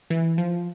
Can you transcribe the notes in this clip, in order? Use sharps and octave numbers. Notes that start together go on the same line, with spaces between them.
E3
F3